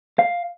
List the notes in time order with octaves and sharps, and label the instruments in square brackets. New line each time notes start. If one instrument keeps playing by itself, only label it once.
[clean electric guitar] F5